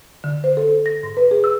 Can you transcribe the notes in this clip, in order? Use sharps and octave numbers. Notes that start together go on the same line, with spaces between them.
D3
C5
A4
A#6
G#2
B4
G#4
E6